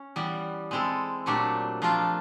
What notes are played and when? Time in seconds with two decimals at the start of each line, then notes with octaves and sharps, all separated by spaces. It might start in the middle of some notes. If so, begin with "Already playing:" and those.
Already playing: C#4
0.16 E3 G3 B3
0.71 G#3 C4 E4 A4
1.26 A#2 F#3 A3 D4 G4
1.82 F3 A3 D4 F4 A#4